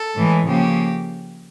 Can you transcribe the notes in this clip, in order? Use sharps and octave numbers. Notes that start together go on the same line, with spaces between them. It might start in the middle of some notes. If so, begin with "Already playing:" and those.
Already playing: A4
A2 E3 G#3
C#3 F3 A#3 G4